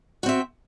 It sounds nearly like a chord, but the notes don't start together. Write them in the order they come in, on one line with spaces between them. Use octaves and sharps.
F#4 C4 E5